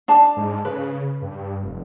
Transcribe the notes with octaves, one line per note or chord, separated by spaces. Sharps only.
D4 A5
G#2
C#3 B4
G2
F1